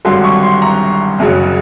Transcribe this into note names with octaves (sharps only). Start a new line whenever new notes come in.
G#1 G2 D3 F#3 C6
C#6
C6
A#5
F#1 F#2 C#3 F#3